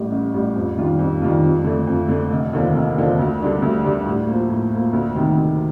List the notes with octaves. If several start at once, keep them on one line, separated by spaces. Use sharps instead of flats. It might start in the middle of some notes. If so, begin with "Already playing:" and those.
Already playing: A1 A2 G3
A1
A2 G3
F2
D#3 G3 D4 F4
F2
D#3 G3 D4 F4
F2
D3 A3
F2
D3 A3
F1
D#2 D3 F3
F1
D#2 D3 F3
D2
D3 G3 D4
D2
D3 G3 D4
A2
F3 A#3
A2
F3 A#3
D2
C3 D#3
D2